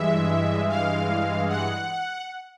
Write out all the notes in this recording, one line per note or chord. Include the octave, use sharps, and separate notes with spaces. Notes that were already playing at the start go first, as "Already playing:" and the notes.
Already playing: G2 E3 G#3 E5
F5
F#5